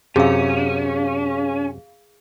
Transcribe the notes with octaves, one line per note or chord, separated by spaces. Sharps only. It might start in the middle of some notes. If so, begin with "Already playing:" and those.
F#2 C3 C#4 G#4 F5